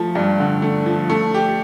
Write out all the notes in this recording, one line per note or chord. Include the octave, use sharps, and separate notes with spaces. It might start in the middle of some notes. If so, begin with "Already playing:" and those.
Already playing: F3 A3
G2
D3
A3
F3
A3
G4